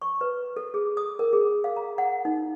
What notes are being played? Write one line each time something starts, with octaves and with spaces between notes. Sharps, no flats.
C#6
B4
A4
G#4
D#6
A#4
G#4
F5
A#5
F#5
D#4